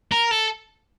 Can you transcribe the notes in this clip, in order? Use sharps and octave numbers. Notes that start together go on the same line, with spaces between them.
A#4
A4